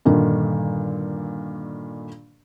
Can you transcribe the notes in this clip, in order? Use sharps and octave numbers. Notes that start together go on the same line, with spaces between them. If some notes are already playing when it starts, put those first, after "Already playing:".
G2 A#2 D3 D#3